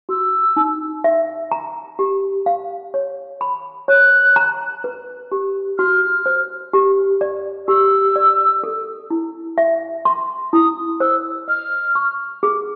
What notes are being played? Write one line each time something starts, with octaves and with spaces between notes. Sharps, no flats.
F#4 E6
D#4
E5
A#5
G4
F5
C#5
B5
C#5 F#6
A#5
B4
G4
F#4 F6
C5
G4
D5
G4 E6
D5
A4
E4
E5
C6
E4 D#6
C5 E6
D#5 F6
C#6
G#4